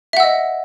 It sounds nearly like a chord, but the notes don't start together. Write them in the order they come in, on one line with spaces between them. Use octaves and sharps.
E5 F#5 E6 D#5